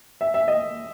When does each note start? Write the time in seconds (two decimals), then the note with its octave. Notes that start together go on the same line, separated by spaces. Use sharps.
0.21 E5
0.34 E5
0.48 D#5